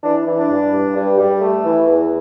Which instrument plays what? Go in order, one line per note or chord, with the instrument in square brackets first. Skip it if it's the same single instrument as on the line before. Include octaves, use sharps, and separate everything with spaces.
[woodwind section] E3 D4
E3
D4
G2
G2
G2
G3
A3
E3
E2